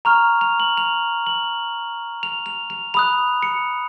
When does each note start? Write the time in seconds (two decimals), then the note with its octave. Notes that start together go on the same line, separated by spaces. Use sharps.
0.05 A#5 C#6 F6 F7
0.41 F7
0.60 F#7
0.77 F7
1.27 F#7
2.23 F7
2.46 F7
2.70 F7
2.94 B5 D#6 F#6 F7
3.43 C#7